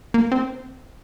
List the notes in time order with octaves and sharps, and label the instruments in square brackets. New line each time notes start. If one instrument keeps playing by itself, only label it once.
[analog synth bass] A#3
C4